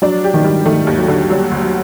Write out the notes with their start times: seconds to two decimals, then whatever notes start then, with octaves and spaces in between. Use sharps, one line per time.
0.02 F#3 D4
0.24 G4
0.34 D#3
0.44 G3
0.66 D#3 A3
0.87 D#2
0.99 F#3
1.08 D3
1.30 F#3 G3
1.51 D2
1.62 F#3